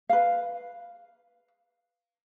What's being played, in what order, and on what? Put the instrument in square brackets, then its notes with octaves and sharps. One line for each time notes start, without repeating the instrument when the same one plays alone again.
[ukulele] B4 F5